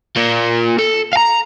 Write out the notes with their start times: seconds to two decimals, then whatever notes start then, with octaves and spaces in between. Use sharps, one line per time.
0.16 A#3 F4
0.79 A4
1.13 F5 A#5